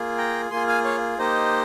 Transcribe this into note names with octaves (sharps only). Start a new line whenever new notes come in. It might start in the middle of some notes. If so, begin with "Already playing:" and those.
Already playing: A#3 F4 G#4
G5 A#5
A#3 F4 G#4 G#5 C6
F5 G#5
C#5 F5
A#3 D#4 G4 C5 D#5